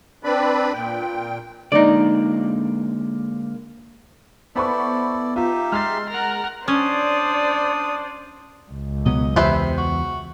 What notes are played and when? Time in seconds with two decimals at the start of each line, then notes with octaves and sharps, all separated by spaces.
0.24 C4 D4 B4 D5 B5
0.73 A#2 G5
1.72 D3 G#3 A#3 D#4 D5
4.55 B3 E4 A4 C5 D5 B5 C#6
5.36 D#4 F4 G4 E5
5.72 G#3 C6 F6 A6
6.10 A#4 F#5 A#5
6.68 C#4 D4 C5 D5 D#6
8.72 C#2
9.06 B2 F#3 B3 D#5
9.36 E2 C3 B4 C5 E5
9.77 F#4